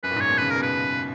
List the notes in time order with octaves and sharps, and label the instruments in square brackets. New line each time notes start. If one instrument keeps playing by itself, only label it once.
[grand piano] F#2 [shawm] B4
[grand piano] A#2
G#2
[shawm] C#5
[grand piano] B2
[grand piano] C#3 [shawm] B4
[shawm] A#4
[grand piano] B2
[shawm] B4